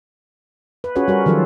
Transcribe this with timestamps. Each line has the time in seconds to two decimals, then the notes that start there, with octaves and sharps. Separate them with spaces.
0.84 B4
0.96 C#4 F4 F#4 G#4 B4 C#5
1.08 G3 F#4 A#4
1.26 D#3 F3 F#3 F4 A4